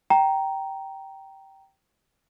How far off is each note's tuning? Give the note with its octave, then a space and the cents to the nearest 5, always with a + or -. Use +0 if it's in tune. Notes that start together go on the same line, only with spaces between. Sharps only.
G5 -10 A#5 +0